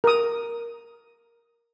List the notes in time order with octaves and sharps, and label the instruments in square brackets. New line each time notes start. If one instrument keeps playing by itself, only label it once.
[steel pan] A#4 D#6